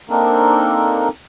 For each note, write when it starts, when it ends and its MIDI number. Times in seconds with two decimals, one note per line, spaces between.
0.10 1.08 58
0.10 1.08 60
0.10 1.08 62
0.10 1.08 63
0.10 1.08 69
0.10 1.08 70